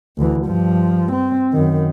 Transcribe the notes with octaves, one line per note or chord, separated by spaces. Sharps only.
D2 E3
G2 F3
C4
F#2 D#3